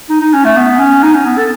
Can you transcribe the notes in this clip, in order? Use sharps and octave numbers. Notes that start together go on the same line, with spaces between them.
D#4
D#4
C#4
A3
B3
C#4
D#4
C#4
B3
A4